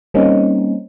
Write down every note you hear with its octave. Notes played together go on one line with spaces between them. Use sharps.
G3 A#3 C4 C#4 D#4